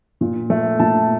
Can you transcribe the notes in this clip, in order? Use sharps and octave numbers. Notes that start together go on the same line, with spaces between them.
A#2
A3
A#2 A5